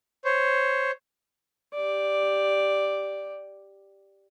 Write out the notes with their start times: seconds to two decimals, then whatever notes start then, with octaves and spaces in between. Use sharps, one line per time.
0.25 C5 C#5
1.74 G4 D5